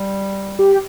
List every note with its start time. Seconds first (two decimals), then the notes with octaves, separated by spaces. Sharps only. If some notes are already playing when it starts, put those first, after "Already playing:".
Already playing: G3
0.59 G4